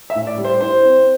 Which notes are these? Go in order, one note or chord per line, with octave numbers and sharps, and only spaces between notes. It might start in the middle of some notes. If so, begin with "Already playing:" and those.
E5
A2
D5
G3
C5
E4 C5
C4